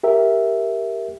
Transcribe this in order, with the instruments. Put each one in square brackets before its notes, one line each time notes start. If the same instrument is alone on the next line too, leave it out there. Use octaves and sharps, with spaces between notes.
[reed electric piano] G4 A#4 E5